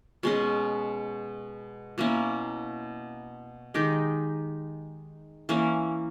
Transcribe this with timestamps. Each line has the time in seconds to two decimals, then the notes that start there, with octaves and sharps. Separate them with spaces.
0.23 B2 G#3 C#4
1.98 B2 A#3 C#4 E4
3.74 D#3 G#3 D#4 G4
5.49 E3 A#3 C#4